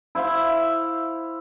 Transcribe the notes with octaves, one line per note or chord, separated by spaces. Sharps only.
E4 C5 E5 F5